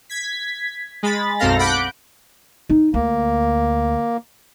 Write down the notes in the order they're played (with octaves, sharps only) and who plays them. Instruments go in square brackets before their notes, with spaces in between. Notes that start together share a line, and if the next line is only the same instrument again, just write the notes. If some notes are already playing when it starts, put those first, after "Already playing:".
[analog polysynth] G#6 B6
G#3 B5 A6
B1 F#2 C4 A4 F5 A#6
F#5 B5 D6 F#6 G6 D7
[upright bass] D#4
[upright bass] D2 [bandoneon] A#3